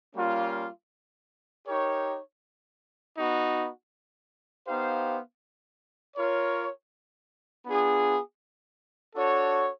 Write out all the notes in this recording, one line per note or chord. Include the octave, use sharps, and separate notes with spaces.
G3 A#3 C#4 F4
D#4 G4 A#4 C#5
B3 D#4 F#4
B3 D#4 G4 C5 F5
F4 A#4 C#5
B3 D4 F4 G#4
D4 F#4 A4 C#5